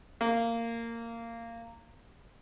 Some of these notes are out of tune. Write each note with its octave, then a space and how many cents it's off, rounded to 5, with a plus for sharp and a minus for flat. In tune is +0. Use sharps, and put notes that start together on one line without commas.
A#3 -15